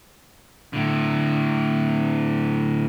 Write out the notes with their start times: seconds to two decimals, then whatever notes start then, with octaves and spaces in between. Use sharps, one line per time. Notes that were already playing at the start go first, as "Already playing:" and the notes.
0.73 A2 D3